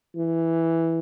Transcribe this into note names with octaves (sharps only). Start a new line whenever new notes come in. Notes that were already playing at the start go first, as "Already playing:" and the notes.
E3